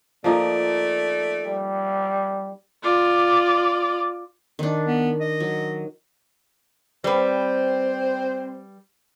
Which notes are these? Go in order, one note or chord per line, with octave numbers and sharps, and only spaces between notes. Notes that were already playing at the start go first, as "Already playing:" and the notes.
F3 A3 A#3 D#4 D5
G3
F4 D5
D#3 D4
B3
D#5
F#3
G3 C4 B4 C5